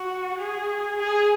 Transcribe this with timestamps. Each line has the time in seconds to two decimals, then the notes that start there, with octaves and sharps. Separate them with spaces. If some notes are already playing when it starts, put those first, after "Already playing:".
Already playing: F#4
0.38 G#4
0.99 G#4